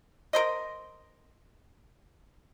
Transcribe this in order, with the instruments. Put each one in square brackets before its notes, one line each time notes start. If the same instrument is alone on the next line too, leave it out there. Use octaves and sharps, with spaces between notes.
[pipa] A#4 C5 D#5